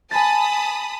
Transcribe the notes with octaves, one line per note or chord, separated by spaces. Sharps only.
G#5 A5 B5 D#6 A6